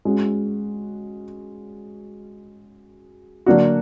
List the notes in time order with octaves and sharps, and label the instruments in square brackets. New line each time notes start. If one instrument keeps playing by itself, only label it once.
[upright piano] G#3 C#4 F#4
D3 F#3 A#3 D4 F#4